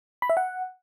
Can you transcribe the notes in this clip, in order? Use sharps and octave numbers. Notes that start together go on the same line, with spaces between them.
B5
E5
F#5